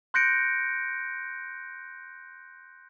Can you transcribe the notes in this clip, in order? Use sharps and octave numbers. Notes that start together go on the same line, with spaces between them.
C6 F#6 G6 A#6 C#7 D7